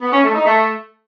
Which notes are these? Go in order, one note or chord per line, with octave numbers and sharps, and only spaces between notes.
B3
C#4
A3
D#4
A3